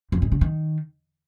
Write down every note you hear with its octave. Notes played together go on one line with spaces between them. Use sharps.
F2
G#2
D3
D#3